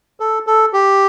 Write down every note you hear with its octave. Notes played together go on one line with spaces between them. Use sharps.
A4
A4
G4